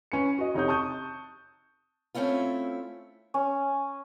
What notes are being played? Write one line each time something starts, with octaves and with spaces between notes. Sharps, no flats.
C#4 B4 C#7
F#4 D#5
F1 D#4 C#5 D#6 G6
A5 C#6 D#6 G6
A3 C4 C#4 E4 F4
C#4